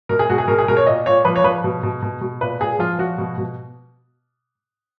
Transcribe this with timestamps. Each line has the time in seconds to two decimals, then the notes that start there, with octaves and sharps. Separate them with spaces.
0.09 B2 A#4
0.19 G#4
0.30 B2 F#4
0.38 G#4
0.48 B2 A#4
0.58 G#4
0.68 B2 A#4
0.77 C#5
0.87 A#2 D#5
1.06 A#2 C#5
1.25 F3 B4
1.36 C#5
1.44 F3 B4
1.64 B2
1.83 B2
2.02 B2
2.21 B2
2.41 A#2 B4
2.60 A#2 G#4
2.79 F3 F4
2.98 F3 F#4
3.18 B2
3.38 B2